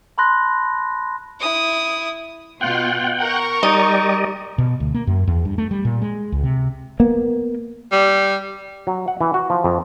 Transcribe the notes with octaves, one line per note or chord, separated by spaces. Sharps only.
A5 B5 C6 F#6 A#6
E4 D#6
B2 F4 F#5 G5
A#4 C#6
G3 D#4 D5 D#5
B2
D2
A#3
F#2
E2
G2
A3
G3
A#2
G#3
C#2
C3
A#3 B3
G3
F#3
F#5
E3
F#4
F3
F2